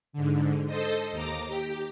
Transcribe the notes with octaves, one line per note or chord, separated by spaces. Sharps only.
G#2 D3
A4 C5 D#5
D#2 A#5 D6
G4